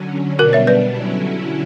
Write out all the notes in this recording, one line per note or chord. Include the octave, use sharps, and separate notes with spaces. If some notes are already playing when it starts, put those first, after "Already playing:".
Already playing: D3 F#3 C#4
B2 G3 B3 D4 F#4 A#4
C#5 E5
B4 D5
D3 F#3 C#4 E4